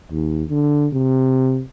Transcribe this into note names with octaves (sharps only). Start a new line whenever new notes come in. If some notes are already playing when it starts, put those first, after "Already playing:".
D#2
D3
C3